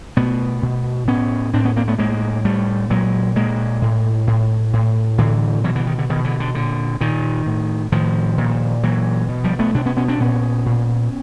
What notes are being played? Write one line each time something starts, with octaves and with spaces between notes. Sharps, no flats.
B2 A3 B3
B2
A2 B3 C#4
A2 C4 D4
B3 C#4
A#3 C4
A3 B3
A2 G#3 A#3
A2 G3 A3
A#2 F#3 G#3
A#2 G#3 A#3
A2
A2
A2
A2 D3 E3
B2 E3 F#3
D3 E3
D#3
D3
B2 D#3
D3 E3
D3
A#2 D3
A#2 D#3
A2
A2 D#3 F3
A#2
A#2 E3 F#3
B2
F3 G3
A3 B3
B2 D4
B3 C#4
B3 C#4
C4 D4
A#2 B3 C#4
A#2